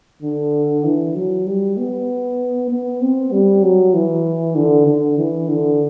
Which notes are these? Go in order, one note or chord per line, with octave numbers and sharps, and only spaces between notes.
D3
E3
F#3
G3
B3
B3
C4
G3
F#3
E3
D3
D3
E3
D3